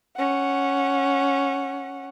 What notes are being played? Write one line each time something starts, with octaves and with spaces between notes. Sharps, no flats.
C#4 F#5